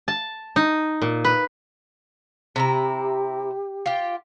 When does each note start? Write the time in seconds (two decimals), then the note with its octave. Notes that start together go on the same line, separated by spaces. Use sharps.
0.08 A5
0.56 D#4
1.02 A#2
1.25 B4
2.56 C3 E4 G4 A#5
3.86 F4 G4